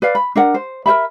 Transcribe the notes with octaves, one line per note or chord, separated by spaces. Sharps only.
B4 D5 F5
B5
D4 A#4 F#5
C5
A#4 C5 E5 B5